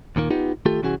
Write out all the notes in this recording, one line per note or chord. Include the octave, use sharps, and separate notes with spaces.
D#2 A#2 D#3 A#3
B3 D#4 F4 G4
D#3 A3 F4 G4 A4
C2 E3 C#4 F#4 G#4